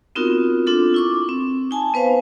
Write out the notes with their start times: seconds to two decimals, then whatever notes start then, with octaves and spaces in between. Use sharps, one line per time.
0.15 B3 C4 D#4 F4 F#4 A#4
0.67 C4 D4 F4 A4
0.94 E4 C#6 D6
1.29 C4
1.71 D#4 G#5 A5
1.94 B3 B4 C5 F5